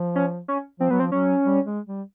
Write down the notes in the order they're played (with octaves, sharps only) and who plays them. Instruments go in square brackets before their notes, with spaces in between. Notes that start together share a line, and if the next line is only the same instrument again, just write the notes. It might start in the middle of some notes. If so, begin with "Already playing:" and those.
Already playing: [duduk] F3
[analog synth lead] C#4
C#4
[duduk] F3 [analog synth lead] C4
[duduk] F#3 [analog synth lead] B3
[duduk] F3 [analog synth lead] C4
[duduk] F#3 [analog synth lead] C#4
[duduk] G3
G#3
G3